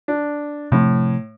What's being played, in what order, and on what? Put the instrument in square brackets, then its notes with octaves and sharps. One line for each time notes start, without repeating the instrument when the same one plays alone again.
[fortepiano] D4
[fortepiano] A2 [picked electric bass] C3 F3 C4